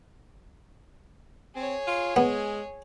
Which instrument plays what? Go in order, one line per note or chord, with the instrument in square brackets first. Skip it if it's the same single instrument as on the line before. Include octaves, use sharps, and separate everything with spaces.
[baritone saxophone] C4 [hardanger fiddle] G#4 C#5
[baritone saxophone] F4
[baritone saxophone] G#3 [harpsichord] B3